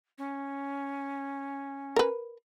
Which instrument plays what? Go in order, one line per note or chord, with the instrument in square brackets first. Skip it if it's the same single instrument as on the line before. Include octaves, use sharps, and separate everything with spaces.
[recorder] C#4
[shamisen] A#4 B4